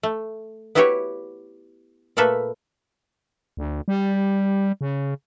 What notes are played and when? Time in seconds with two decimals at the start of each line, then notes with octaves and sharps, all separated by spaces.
0.03 A3
0.75 B3 E4 F#4 G4 B4 C#5
2.17 A#2 A3 A#3 A4 B4 E5
3.57 D2
3.88 G3
4.81 C#3